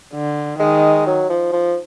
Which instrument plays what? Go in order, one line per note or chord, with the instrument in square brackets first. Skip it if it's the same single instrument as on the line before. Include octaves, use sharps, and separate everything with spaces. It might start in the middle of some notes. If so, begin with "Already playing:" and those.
[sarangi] D3
[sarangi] D#3 [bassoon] G#3
[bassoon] F#3
F3
F3